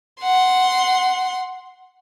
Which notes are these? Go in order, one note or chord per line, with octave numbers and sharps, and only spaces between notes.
F#5 C6